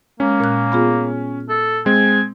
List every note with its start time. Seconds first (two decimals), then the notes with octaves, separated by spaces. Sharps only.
0.20 G#3 A#3 C#4
0.40 A#2 F#6
0.72 B3 F4 G#4
1.49 A4
1.86 G#3 C4 G#5